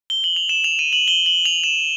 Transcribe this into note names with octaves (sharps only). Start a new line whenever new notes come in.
G7
F#7
F7
E7
F7
D#7
F#7
G7
F#7
F7
E7